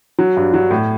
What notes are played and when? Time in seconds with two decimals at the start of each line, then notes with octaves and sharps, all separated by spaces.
0.19 F#3
0.37 G2
0.54 F#3
0.71 A2